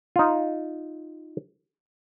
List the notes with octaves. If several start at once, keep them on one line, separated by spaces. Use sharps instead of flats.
D#4 F4